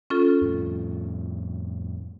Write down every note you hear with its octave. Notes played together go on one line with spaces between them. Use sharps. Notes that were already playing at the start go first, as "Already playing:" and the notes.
C#4 F4 A4
F2 A2